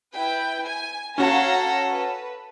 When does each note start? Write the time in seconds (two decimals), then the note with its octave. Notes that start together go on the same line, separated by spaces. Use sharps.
0.13 E4 B4 G5
0.66 G#5
1.18 C#4 F#4 A4 C#5 F5 A#5
1.91 B4